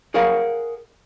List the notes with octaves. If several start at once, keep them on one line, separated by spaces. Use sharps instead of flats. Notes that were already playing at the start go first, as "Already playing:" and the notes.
G#4 A#4 C#5 F5 F#5